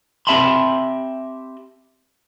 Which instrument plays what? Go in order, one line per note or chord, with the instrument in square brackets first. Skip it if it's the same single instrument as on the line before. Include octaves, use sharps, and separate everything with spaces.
[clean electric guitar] C4 G4 E5 A5 B5 C6